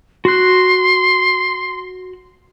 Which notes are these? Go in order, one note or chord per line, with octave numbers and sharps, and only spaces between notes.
F#4 C6 F#6